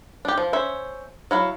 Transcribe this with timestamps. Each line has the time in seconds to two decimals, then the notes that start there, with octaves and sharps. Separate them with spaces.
0.25 D4 G4
0.38 F3
0.53 C#4 C5 E5
1.31 F#3 E4 F5